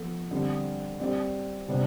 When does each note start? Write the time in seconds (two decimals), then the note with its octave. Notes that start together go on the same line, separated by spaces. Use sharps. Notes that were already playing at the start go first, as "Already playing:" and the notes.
Already playing: F3 B3 A4
0.31 D3 G3 C4
1.00 G3 C4 G4 D5
1.68 C3 G3 B3 D4